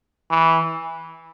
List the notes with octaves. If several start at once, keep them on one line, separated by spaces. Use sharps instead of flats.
E3